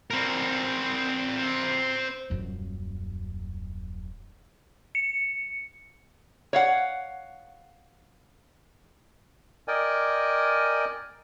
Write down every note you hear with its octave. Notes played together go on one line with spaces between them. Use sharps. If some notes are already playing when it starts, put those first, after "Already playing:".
C4 A#4
D#1 F#2
C#7
C#5 F5 F#5
A#4 D5 D#5 G5 G#5